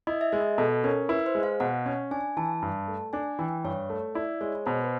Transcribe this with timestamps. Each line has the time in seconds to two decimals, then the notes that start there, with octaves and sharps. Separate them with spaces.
0.07 E4 D#5
0.21 E5
0.32 G#3 D#5
0.58 B2 A4
0.84 C#4 A#4
1.09 E4 B4
1.26 C5
1.35 G#3
1.43 F5
1.60 B2 F#5
1.86 C#4
2.11 D4 G#5
2.37 E3 A5
2.62 G2
2.88 A3
3.13 D4 G#5
3.39 E3 G5
3.64 G2 C#5
3.90 A3
4.15 E4 D5
4.41 G#3 C#5
4.66 B2 C5
4.84 B4